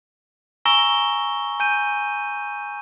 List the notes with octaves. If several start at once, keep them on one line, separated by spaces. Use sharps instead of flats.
G#5 A#5 C#6 E6 A#6 G7
G#5 G6 D#7